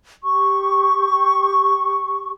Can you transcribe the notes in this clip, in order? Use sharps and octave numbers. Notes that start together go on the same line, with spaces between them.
G4 C#6